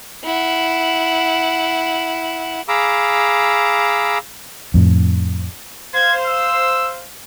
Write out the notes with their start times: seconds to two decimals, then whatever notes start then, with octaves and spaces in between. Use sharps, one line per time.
0.24 E4 F#5
2.68 G#4 F5 A#5 B5 D6 E6
4.74 F2 A2
5.95 C5 F5 G#6
6.26 E6